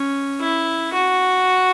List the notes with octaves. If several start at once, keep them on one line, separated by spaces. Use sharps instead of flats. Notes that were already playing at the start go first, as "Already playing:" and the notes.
Already playing: C#4
E4
F#4